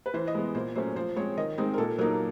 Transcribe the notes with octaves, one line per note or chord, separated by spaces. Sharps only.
B4
E3 C5
D#5
G#3 B3
A#2 C5
F#3 A3 C#4 C5
F3 C5
G#3 C4 C#5
D#3 D#5
G#3 C4 D#4
A#4
A#2 A4
F#3 A#3 D#4 A#4